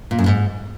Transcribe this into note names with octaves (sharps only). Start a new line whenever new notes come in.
A#2
F#2
G#2